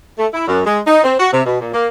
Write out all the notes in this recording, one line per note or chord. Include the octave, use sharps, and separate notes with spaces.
A3
E4
F#2
G#3
D#4
C4
F#4
C3
B2
A#2
A#3